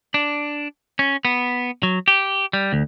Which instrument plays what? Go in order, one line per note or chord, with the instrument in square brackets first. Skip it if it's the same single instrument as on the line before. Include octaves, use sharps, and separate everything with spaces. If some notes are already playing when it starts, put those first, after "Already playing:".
[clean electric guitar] D4
C#4
B3
F#3
G4
G3
D2